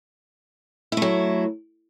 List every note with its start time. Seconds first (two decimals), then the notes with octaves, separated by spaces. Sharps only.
0.92 E4
0.97 A3
1.02 F#3